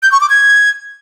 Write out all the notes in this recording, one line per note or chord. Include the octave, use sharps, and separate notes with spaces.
G6
C#6
D6
G#6